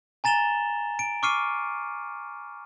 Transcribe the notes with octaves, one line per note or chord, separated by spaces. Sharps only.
G#5 A#5 A6 E7 F7 G7
D7
C#6 D6 F6 C7 C#7 D#7